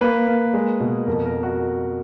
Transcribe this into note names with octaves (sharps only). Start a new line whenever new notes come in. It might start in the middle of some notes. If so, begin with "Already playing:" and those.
A#3 B4
A#3
G#3
B2
F2 A#4
A#4
F#4